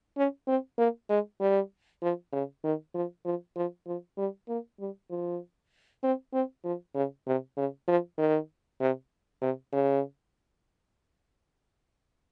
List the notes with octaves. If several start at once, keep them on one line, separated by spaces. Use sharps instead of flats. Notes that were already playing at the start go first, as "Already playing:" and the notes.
C#4
C4
A#3
G#3
G3
F3
C#3
D#3
F3
F3
F3
F3
G3
A#3
G3
F3
C4
C4
F3
C#3
C3
C#3
F3
D#3
C3
C3
C#3